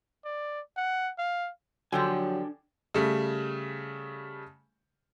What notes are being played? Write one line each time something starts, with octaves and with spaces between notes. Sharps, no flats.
D5
F#5
F5
D3 F3 F#3 D4 G4 G5 G#5
C#3 G3 A3